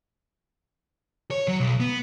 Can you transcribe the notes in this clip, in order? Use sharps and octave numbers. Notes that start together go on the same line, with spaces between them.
C#5
F#3
B1
B3